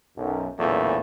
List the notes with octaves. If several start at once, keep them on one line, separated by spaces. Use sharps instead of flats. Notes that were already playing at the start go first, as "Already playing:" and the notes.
B1 F#2
B1 E2 A#2 C#3 E3 A3